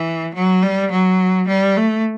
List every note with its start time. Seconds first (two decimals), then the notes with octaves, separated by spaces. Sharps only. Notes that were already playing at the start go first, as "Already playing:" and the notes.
Already playing: E3
0.34 F#3
0.62 G3
0.91 F#3
1.48 G3
1.76 A3